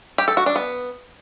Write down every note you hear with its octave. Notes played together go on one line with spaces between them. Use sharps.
G4
A4
F#4
D4
B3